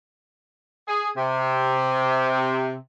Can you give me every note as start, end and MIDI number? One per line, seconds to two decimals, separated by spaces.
0.88 1.09 68
1.17 2.74 48